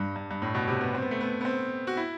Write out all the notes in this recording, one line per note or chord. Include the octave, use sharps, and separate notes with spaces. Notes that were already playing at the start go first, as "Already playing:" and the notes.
Already playing: G2
G2
G2
A2
B2
C3
B3
C4
B3
A3
B3
B3
C4
F#4
E4